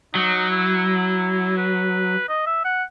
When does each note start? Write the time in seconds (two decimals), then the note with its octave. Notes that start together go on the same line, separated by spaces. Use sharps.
0.15 F#3 D#4
0.50 E4
1.57 B4
2.29 D#5
2.47 E5
2.65 F#5